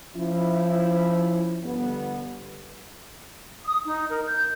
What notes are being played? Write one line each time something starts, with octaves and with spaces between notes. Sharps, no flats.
F3 C#4 E4
G1 B3
D#6
D#4
A#4
G6